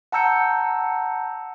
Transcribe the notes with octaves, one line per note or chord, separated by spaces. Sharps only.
F#5 A5 A#5 E6 G6 C#7